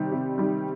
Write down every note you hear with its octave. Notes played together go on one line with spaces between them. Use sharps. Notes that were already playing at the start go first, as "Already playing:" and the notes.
Already playing: C3 D#3 G3 G4
C3
D#3 G3